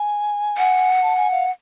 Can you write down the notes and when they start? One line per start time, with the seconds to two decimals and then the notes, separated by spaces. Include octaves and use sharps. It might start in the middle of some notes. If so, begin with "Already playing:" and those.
Already playing: G#5
0.58 F#5
1.03 A5
1.17 G#5
1.31 F5